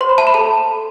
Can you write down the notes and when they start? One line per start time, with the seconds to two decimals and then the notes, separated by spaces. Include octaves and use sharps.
0.01 C5 C6
0.09 B5
0.18 E5 A5
0.27 B5
0.34 A4 A5